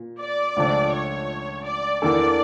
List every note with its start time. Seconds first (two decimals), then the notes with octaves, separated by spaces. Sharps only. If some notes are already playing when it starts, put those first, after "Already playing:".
Already playing: A#2
0.19 D5
0.56 C#2 C#3 F3 A3 D4
0.92 C#5
1.65 D5
2.02 E2 E3 A#3 D4 A4 D5